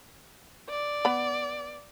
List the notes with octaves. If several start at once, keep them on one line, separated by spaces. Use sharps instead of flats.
D5
B3 B5